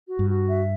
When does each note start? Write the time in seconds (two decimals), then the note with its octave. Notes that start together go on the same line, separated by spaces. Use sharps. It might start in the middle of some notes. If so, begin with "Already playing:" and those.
0.08 F#4
0.19 G2
0.29 F#4
0.49 E5